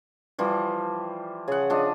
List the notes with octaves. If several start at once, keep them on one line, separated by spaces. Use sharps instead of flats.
E3 F3 G3
C#3 G#4 F#5
F3 D4 D#5